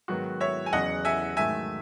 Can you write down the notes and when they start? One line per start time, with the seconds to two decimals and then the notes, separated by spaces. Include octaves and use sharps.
0.08 G#2 D#3 F#3 B3 F#4
0.40 C#5 E5
0.66 G#5
0.73 E2 C#3 F#3 C#4 G#4 D#5 F#5
1.05 E5 G#5
1.37 G#2 D#3 F#3 A3 E5 G#5